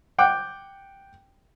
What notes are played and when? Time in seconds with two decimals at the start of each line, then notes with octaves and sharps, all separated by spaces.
0.18 F#5 G5 D6